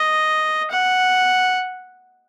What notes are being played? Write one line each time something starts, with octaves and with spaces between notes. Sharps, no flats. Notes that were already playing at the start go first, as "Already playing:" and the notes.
Already playing: D#5
F#5